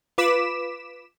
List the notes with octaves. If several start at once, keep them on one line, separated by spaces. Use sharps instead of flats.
F4 B4 D6 B6 E7